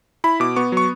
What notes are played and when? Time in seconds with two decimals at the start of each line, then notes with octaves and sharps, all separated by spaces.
0.24 E4 B5
0.40 B2 D6
0.56 B3 C#6
0.72 F#3 C#6